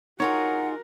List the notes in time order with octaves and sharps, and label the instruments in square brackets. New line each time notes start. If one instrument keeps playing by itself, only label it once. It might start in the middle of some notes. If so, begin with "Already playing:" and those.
[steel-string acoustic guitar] D#4 F4 G#4 [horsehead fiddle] F#4 A#4 [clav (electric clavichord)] C#5 [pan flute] F#5